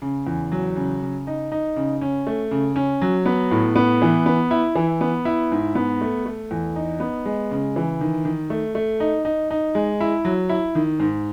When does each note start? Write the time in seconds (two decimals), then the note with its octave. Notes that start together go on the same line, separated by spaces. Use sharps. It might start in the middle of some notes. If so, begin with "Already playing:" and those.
0.02 C#3
0.27 E2
0.52 F#3
0.76 C#3
1.02 C#3
1.27 D#4
1.52 D#4
1.76 C#3
2.01 C#4
2.27 A3
2.51 C#3
2.76 C#4
3.02 F#3
3.26 B3
3.51 A2
3.76 B3
4.02 E3
4.26 B3
4.51 E4
4.75 E3
5.01 B3
5.25 E4
5.51 G#2
5.75 B3
6.01 A3
6.26 A3
6.51 E2
6.76 D#4
7.00 B3
7.26 G#3
7.51 C#3
7.76 E3
8.01 D#3
8.25 D#3
8.50 A3
8.75 A3
9.00 D#4
9.25 D#4
9.51 D#4
9.75 G#3
10.00 E4
10.25 F#3
10.49 E4
10.75 D#3
10.99 G#2